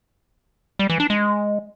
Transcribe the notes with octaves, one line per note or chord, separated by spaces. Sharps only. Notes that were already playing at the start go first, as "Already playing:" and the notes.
G3
E3
D4
G#3